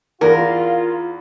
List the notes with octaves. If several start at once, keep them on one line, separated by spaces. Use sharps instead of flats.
E2 F4 A#4